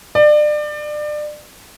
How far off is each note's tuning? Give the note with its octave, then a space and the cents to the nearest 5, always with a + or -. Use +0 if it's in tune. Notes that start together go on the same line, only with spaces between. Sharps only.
D5 +30